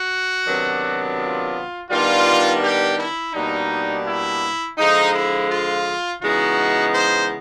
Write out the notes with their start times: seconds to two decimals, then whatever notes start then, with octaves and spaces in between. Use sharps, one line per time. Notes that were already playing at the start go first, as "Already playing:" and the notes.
Already playing: F#4
0.47 C3 D#3 F#3 B3 D4
1.18 F4
1.90 D#3 G3 B3 D4 F4
2.63 G4
2.98 E4
3.34 B2 G3 A#3 D4 D#4
4.05 E4
4.78 D3 F3 G#3 D#4
5.14 E4
5.49 F4
6.21 C#3 E3 G#3 B3 D#4 F#4
6.93 C5